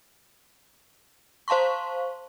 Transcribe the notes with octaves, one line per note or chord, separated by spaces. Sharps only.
C5 F5 A5 C6 C#6